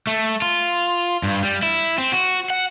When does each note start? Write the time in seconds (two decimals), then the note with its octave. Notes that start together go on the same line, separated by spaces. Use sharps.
0.07 A3
0.42 F4
1.23 G2
1.43 G3
1.63 E4
1.98 C4
2.12 F#4
2.50 F#5